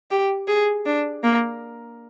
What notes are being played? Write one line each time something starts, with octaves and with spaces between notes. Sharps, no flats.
G4
G#4
D4
A#3